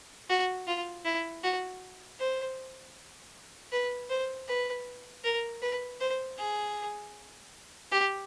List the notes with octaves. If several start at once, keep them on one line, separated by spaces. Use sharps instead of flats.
F#4
F4
E4
F#4
C5
B4
C5
B4
A#4
B4
C5
G#4
G4